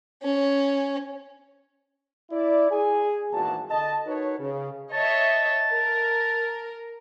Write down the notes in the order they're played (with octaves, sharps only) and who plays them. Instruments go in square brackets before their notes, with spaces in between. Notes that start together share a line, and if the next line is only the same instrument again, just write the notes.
[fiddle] C#4
[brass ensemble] E4 D5
G#4 G#5
G#1 E2 G2 A#2 F#4 A5
D3 D#5 A5
D#4 F#4 A#4 B4 C#5
C#3
[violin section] C#5 D#5 E5 [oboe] A5
[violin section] A#4